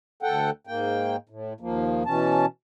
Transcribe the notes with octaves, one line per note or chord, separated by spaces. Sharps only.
D2 A4 F#5 G5
G#2 A#3 G5
A2
D#2 F3 A#3
B2 E3 C#4 A5